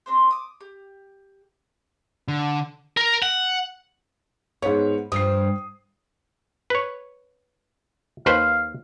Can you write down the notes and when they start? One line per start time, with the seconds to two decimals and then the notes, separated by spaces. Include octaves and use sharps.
0.06 C4 D4 C5
0.31 D6 D#6
0.61 G4
2.28 D3
2.97 A#4
3.23 F#5
4.62 G#2 B3 C#5
5.12 G2 F3 D#6 C7
6.70 B4 C#5
8.26 D#2 B4 C5 F5